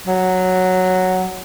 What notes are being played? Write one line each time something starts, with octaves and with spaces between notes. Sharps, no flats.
F#3